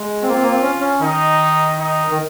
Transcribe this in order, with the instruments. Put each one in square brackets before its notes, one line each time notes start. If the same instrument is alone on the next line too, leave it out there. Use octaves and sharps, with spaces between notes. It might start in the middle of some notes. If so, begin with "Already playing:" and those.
Already playing: [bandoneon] G#3
[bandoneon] C4 [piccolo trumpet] F4
[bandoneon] A#3
C4
A#3
C4
C#4
C#4
[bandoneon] D#3 [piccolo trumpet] D#4
[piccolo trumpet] D#4
[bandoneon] D#3